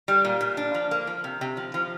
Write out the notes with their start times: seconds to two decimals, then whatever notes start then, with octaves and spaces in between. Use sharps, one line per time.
0.08 G3
0.25 A#2
0.41 A#2
0.57 D4
0.74 F3
0.91 A#3
1.07 F3
1.24 C3
1.41 C3
1.57 F3
1.74 F3